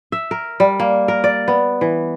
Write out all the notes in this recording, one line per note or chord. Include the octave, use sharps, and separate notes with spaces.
E5
A#4
G3
A#3
A#4
D5
B3
E3